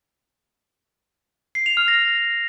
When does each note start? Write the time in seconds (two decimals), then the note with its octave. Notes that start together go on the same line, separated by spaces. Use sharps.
1.55 C7
1.66 F7
1.77 F6
1.88 A#6